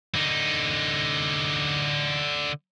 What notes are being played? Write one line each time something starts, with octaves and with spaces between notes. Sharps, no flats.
D3 D#4